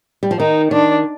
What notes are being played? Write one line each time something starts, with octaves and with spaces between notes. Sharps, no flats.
G3
F3
D#3 D#4
D#3 D4